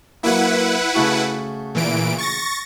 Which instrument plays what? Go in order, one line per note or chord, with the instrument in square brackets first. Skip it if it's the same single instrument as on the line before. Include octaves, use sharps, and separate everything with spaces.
[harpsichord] F#3 A#3 [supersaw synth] E4 B4 F#5
[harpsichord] C#3 A3 F#4
[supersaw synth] A#2 E3 D7
C#6 A6 A#6